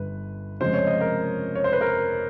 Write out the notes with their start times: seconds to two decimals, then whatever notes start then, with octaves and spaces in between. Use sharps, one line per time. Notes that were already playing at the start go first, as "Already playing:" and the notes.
Already playing: G1 G2 B4
0.60 F1 F2 C#3 F3 G#3 C5
0.74 C#5
0.87 D#5
1.00 A#4
1.55 C#5
1.64 C5
1.73 B4
1.81 A#4